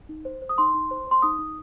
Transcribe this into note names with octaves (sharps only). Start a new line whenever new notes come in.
D#4
C5
C5
D#6
D#4 C6
D#4
C5
C5 C6
D#4 D#6
D#4